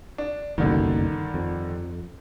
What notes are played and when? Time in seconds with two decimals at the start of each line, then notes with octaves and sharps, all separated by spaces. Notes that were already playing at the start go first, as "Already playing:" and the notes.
0.18 D4
0.58 F#1 B1 G2 D3 D#3
1.34 F2